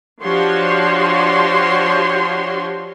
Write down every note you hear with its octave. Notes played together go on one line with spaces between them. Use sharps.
F3 D4 F#4 G4 C#5 C6